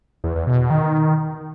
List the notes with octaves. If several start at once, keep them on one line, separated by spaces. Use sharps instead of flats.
E2
E2
B2
B2
D#3